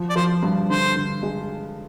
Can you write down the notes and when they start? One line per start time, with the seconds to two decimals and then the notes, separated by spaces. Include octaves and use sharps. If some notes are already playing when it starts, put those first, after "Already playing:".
Already playing: F3
0.09 D5
0.16 F3 C5
0.43 G2
0.69 D3 C5
0.96 D3
1.23 G#3